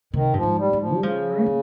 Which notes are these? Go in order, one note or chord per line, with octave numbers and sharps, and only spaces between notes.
C3 D#3
G2 F3
G#2
G3
G#2
F3
G3
C#3 F3
C4
A#3